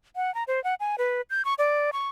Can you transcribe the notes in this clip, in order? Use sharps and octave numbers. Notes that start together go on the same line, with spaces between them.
F#5
A#5
C5
F#5
G#5
B4
G6
C#6
D5
C#6